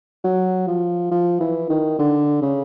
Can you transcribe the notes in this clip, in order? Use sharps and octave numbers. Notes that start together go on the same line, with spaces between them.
F#3
F3
F3
E3
D#3
D3
C#3